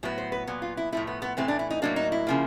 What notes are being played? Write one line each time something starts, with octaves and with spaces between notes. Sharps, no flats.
A2 F#3 B3
C5
B4
A#2 F#3 B3
F4
E4
A2 F3 A3 E4
B3
B3
A2 E3 A3 C4
D4
E4
D#4
A2 F#3 A#3 D4
D#4
E4
C#3 F3 A#3